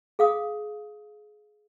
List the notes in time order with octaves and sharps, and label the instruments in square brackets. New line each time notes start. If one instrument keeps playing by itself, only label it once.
[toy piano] G#4 F5 D#6